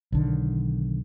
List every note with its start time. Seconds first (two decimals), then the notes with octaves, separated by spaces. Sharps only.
0.12 B1 D3 D#3